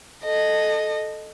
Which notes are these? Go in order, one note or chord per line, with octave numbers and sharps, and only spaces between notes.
A4 D#5